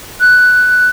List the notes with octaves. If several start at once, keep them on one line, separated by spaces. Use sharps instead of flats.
F#6